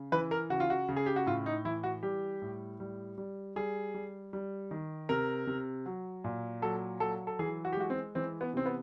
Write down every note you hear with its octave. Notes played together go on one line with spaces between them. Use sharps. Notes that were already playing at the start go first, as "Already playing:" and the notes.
Already playing: C#3
E3 B4
A#4
C#3 F#4
F4
F#4
C#3
G#4
G4
F#4
A2 F4
D#4
E3 E4
F#4
G3 G4
A2
G3
G3
G3 G#4
G3
G3
D#3
C3 A#4
C3
F#3
A#2
F#3 A4
F#3 A4
A4
E3 G#4
F#4
G4
G#3 F#4
C4
E3 C4
B3
C3 C4
B3